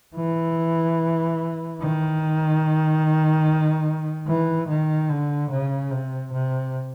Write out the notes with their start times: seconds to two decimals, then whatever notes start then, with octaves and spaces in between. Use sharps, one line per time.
0.16 E3
1.81 D#3
4.28 E3
4.68 D#3
5.09 D3
5.51 C#3
5.91 C3
6.33 C3